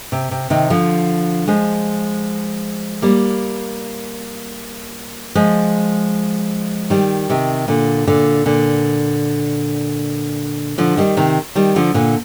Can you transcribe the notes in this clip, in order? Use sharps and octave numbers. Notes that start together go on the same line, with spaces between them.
C3
C3
C3 D#3
D3 F3
F3 G#3
G3 A#3
F3 G#3
D#3 G3
C3 D#3
A#2 D3
A#2 D3
A#2 D3
D3 F3
D#3 G3
C3 D#3
D#3 G3
D3 F3
A#2 D3